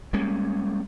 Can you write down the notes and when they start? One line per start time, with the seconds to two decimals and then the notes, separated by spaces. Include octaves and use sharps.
0.13 G3 G#3 A#3 C#4